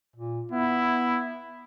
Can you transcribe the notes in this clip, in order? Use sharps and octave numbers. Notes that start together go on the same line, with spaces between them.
A#2
B3 E4